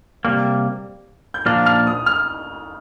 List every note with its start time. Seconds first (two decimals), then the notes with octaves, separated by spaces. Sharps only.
0.25 C3 G3 A#3
1.34 G6
1.46 A#2 F3 A#3 D4 F6
1.66 F6
1.87 D#6
2.06 F6